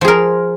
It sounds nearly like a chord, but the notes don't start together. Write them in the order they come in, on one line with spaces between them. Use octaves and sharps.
F3 G#4 A#4